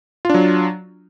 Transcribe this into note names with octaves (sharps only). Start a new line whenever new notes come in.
F#3 D4 F4